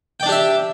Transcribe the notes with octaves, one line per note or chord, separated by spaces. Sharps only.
D4 G4 D5 E5 G5